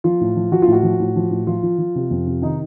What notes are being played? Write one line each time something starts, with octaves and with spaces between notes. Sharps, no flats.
F3 F4
A2
F3
F3 F#4
F4
A2
F#4
F3
A2
F3
A2
F3 F4
F3
F3
C3
F2
C3
D#3 D#4